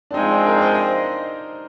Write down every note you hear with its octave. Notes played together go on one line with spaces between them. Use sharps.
D4
F3 G#3 C4 D#4
D4
A#4
D5
C5
D#5